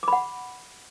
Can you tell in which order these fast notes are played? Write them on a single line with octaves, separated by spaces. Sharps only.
D6 B5 F#5